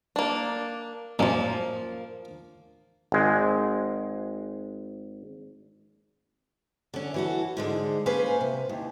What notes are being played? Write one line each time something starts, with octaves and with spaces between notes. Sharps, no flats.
A#3 D4
F#2 A#2 F3 A#3
G#1 G#3
D3 C#4
E3 F#4 A4
G#2 D3 G#3
A#3 C#4 B4 C5 F5 G#5
C3
D#2